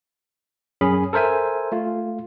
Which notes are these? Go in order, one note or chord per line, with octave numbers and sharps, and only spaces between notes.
F#2 C#4 G#4 B5
A4 A#4 C5 E5 G#5
A3 F4